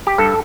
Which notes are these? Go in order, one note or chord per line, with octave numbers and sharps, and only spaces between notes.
G4
G2 A4